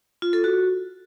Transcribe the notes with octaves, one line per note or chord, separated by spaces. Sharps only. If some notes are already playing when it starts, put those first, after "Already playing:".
F4
A4
F#4